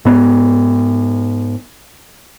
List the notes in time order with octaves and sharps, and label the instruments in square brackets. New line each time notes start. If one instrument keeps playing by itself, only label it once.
[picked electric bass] G#2 B3